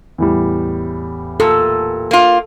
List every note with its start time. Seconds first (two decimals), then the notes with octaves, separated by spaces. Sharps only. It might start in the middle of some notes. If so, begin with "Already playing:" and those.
0.18 E2 A2 G3
1.40 A#2 A4
2.11 A#3 F4